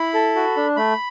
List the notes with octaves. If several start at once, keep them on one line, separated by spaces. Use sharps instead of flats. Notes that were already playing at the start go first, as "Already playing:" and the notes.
Already playing: E4 B5
A4
F#4
D4
A3 B5